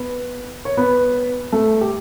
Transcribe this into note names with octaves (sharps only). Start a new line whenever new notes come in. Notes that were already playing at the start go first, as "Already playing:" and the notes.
Already playing: B3 B4
C#5
B3 B4
A3 A4
G4